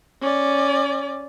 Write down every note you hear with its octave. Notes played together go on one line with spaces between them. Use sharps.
C#4 D5